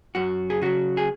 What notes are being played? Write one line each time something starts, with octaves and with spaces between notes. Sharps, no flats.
F#2 F#4
G#4
C#3 F#3 F#4
G#4